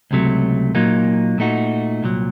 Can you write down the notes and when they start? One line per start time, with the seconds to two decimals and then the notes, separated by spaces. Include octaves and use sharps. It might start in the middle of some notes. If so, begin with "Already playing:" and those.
0.11 C#2 C3 F#3 A3
0.75 A#2 F#3 A#3 D#4
1.38 A#2 A3 D#4 F#4
2.03 C2 A#2 F#3